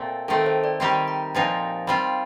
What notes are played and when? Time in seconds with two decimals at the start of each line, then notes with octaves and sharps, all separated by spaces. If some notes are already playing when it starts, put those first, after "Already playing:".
Already playing: A#2 A3 C4
0.28 D#3 A3 C4 A4
0.46 C5
0.64 D5
0.80 D#3 G3 C4 D#4 G4 A#5
1.08 A#5
1.35 A#2 F3 C4 D#4
1.87 G3 C4 F4 C6